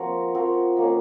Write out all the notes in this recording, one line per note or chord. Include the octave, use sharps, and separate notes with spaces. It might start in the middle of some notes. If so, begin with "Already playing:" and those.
Already playing: F3 C4 F#4 A#4
F3 C4 F#4 A#4
D#3 A#3 C#4